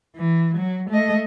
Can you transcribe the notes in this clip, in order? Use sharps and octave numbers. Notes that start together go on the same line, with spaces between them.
E3
F#3
A3 D#5